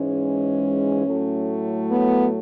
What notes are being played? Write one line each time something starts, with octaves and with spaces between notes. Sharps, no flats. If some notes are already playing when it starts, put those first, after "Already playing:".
Already playing: G#2 E3 G#3 C#4
A2 F#3 A3
B3